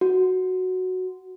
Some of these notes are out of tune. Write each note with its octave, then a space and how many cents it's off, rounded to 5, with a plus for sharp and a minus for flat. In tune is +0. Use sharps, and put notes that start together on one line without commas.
F#4 +0